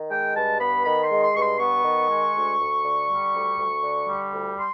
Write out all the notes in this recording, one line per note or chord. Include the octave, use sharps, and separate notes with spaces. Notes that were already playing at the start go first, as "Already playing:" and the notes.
Already playing: D#3
G#3 G5
G2 A5
B3 B5
D#3 B5
C6
G#3
C6
G2 C#6
C6
B3 C#6
D#3
G#3
D2
D2
D3
G3
D2
D2
D3
G3
D2
C6